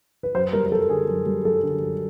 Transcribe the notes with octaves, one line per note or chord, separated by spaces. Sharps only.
B4
F#2 C5
G3 A#4
A#4
F#2 A4
D3 G#4
F#2
G3
F#2 A4
D3
F#2